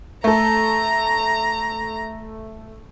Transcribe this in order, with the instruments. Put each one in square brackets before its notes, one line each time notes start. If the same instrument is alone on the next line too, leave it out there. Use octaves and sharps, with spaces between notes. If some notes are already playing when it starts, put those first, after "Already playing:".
[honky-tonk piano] A3 A4 [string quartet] A#5